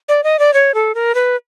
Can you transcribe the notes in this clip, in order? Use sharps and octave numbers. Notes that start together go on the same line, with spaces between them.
D5
D#5
D5
C#5
A4
A#4
B4